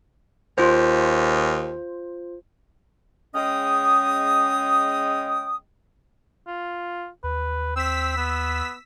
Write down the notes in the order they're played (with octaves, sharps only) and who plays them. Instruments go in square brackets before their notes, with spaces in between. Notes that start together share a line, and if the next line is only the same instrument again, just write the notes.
[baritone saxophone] D#2 [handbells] F4 C5
[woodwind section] C#3 G#3 C#4 D#5 G5 D#6
[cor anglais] F4
[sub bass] D#2 [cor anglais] B4
[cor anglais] C4 [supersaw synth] E6 B6
[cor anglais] B3